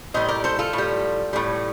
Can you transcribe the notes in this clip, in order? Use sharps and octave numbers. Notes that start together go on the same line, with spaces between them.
A2 G3 C5 D#5
A#4 D5
A4 C5
F4 A4
A2 G3
A2 G3